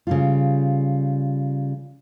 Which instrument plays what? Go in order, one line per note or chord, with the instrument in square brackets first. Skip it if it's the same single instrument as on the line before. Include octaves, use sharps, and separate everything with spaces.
[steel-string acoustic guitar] C#3 G3 F4